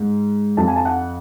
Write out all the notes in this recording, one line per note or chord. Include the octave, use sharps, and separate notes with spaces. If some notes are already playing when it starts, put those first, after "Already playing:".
Already playing: G#2
F2 F3 A5
G#5
A5
F#5